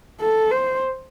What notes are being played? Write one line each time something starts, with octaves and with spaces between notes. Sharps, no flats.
A4
C5